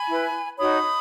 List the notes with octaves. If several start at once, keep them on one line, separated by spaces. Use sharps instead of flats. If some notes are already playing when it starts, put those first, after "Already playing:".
Already playing: G#5 B5
E4 B4
D#4 F#4 C#5 B5 D#6